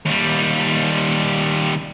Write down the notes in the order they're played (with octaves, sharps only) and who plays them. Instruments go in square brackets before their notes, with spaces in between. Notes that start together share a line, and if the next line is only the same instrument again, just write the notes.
[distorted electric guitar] D#2 G3